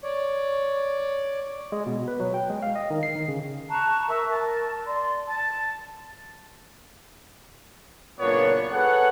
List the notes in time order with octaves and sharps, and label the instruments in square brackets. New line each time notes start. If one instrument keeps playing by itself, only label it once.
[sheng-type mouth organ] C#5 D5
[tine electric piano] G#3
B2
B4
F#3
G5
G#3
F5
D#5
D#3
C7
D#3
C#3
[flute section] A5 A#5 C#6 F#6
A#4 E5 C#6 E6
A#4 A5
D5 C6
A5
[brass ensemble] F#1 A#2 A#3 B3 D4 C#5
G#4 A4 B4 C#5 F#5